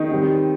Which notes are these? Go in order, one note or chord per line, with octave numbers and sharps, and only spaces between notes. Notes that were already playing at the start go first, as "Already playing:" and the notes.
Already playing: D#3 D#4
G3 C4 G4